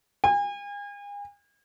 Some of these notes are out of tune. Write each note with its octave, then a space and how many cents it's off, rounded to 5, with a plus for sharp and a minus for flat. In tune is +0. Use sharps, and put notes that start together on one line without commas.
G#5 -40